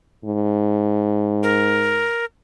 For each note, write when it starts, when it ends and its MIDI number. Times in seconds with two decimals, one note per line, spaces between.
0.25 2.11 44
1.43 2.25 70